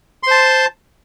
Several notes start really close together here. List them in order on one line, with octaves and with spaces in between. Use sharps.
C6 C5 A5